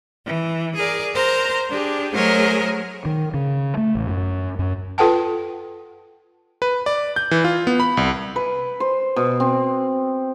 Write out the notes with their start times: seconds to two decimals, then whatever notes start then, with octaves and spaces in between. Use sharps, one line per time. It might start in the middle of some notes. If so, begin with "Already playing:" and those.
0.24 E3
0.75 G#4 A#4 D5
1.12 A#4 C5 A#5
1.68 D4 G4 G#4
2.12 F#3 A3 G#4 A#4 C5 C#5
3.05 D#3
3.34 C#3
3.77 A3
3.95 A1
4.07 F#2
4.59 F#2
4.98 F4 A4 B4 F#5 G5 A5
6.62 B4
6.86 D5
7.16 G6
7.31 E3
7.44 F4
7.67 B3
7.80 B5
7.97 C2
8.36 B4
8.80 C5
9.16 B2
9.40 C4